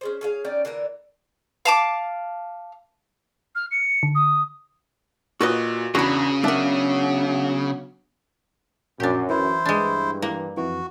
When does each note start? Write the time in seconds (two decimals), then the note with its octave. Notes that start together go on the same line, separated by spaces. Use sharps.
0.01 C#4 G#4 C5
0.21 C#4 G#4 F5
0.45 C#4 D#4 D5 G5
0.65 D3 E3 A#3 A#4
1.65 F5 A5 D6
3.55 F6
3.71 C#7
4.03 D3
4.15 D#6
5.41 A#2 F#4 B4 D#5
5.95 E2 C#3 D4 F#4 B5
6.44 F#3 B3 D4 A#4 E5
9.00 A#1 F#2 D4 G4
9.30 E3 E4 C5
9.66 G2 G#3 D4
10.22 E3 A#3
10.57 F2 E3 F#4